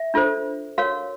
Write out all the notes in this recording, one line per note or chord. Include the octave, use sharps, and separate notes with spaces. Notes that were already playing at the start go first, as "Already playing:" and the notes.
Already playing: E5
D4 F4 A4 C5
F#4 A#4 C#5 F5